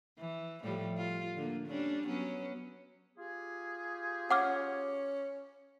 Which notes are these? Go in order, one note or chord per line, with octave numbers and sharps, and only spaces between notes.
E3
A2 F3 G3
F4
D3 A#3
G3 C#4 D4
F#3 B3 C#4
F4 G4 G#4
C#4 F#5 D6 F6